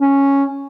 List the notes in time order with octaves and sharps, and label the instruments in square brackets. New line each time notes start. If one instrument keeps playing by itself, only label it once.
[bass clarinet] C#4